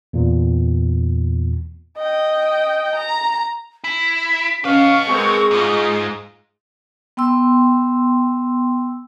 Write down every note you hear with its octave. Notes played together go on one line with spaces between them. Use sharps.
E2 A#2
D#5 G5
A#5
E4 B6
C#4 B4 D#5 F5 C#6
G#3 C4 G#4 A#4
G#2 D#4 F4 D#5
B3 G5 C6 E6